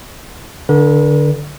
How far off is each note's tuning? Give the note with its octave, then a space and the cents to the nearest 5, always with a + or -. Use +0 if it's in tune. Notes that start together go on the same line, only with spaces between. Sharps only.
D3 -5 B4 -45